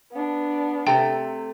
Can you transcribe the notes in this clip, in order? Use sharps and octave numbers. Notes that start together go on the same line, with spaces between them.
B3 D4
C3 A3 G5 A#5